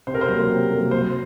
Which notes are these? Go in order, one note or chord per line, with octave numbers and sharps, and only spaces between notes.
C3 C5
A#4
C5
F#3 A#3
C3
F#3 A#3
F#3 C5